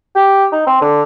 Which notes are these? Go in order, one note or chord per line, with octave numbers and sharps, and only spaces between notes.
G4
D#4
C4
D3